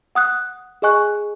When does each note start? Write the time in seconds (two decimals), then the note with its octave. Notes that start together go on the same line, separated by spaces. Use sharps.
0.15 F#5 D#6 F#6
0.82 G#4 D#5 G#5 C#6 F#6